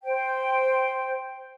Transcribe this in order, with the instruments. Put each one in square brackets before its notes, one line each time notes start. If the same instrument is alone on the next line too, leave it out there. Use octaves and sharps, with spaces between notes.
[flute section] C5 G5